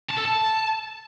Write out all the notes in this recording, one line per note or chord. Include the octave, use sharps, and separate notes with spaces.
A5
A4
A5